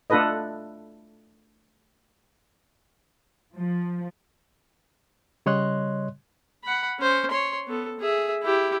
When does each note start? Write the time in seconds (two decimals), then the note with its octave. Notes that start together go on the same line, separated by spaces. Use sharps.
0.10 A3 D4 F4 A4 B4 D#5
3.54 F3
5.46 C#3 G3 C#5 D#5 C6 F#6
6.64 F#5 B5
6.99 C#4 C5
7.31 C#5 C6
7.67 B3 A4
8.00 G#4 E5
8.43 E4 G4